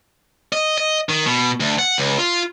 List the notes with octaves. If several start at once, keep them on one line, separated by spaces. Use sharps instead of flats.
D#5
D#5
D#3
B2
D2
F#5
C#2
F4